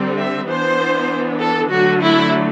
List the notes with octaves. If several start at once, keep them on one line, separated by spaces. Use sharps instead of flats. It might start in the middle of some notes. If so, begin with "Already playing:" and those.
Already playing: D3 G3 C4
E5
E3 B3 D4 C5
A4
D3 F#3 A3 F#4
E4